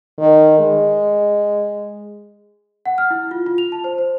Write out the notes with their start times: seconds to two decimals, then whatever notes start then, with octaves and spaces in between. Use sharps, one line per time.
0.19 D#3
0.59 G#3
2.86 F#5
2.98 F6
3.10 E4
3.31 F4
3.46 F4
3.58 F7
3.72 A5
3.84 C5
3.98 C5